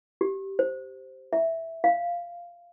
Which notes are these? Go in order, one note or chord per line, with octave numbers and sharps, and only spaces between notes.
G4
C5
E5
F5